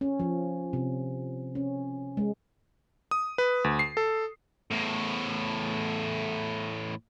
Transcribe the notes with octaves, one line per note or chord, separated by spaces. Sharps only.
C#4
F3
C3
C#4
G#3
D#6
B4
D2
C7
A4
E2 A2